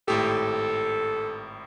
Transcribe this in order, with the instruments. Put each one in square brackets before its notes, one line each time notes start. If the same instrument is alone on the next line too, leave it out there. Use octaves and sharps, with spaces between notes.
[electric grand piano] G#1 A2 G4 [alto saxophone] A4